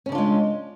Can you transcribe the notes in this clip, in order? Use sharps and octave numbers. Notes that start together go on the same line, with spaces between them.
C#3 G#3 C#4 D4 F4